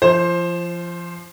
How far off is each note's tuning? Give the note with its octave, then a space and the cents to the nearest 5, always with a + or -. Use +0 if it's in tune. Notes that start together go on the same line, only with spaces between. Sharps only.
F3 -25 C5 +15